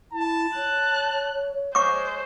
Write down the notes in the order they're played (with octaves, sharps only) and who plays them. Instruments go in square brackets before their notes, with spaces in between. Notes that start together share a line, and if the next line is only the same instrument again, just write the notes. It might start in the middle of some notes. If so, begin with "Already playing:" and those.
[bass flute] E4 [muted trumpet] A5
[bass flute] C#5 [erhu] F#6
[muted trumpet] G#3 [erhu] C5 [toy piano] C#6 D6